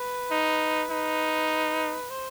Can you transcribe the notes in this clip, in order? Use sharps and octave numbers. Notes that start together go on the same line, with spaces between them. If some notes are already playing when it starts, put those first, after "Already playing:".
Already playing: B4
D#4
D#4
C5